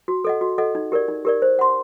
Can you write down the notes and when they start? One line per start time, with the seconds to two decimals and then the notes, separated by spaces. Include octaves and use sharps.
0.08 F#4
0.24 A4 D#5 F#5
0.41 F#4
0.58 A4 D#5 F#5
0.75 D#4
0.92 G4 A#4 D5
1.08 D#4
1.25 G4 A#4 D5
1.42 C5
1.59 F#5 C6